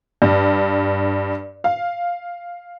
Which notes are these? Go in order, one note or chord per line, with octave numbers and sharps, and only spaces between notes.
G2
F5